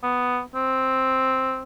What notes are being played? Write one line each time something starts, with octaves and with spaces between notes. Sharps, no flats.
B3
C4